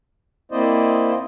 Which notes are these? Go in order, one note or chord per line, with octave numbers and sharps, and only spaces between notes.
A#3 C4 E4 C5 D5 D#5